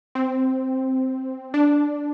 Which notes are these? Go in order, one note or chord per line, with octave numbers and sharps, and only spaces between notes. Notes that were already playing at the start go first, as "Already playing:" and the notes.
C4
D4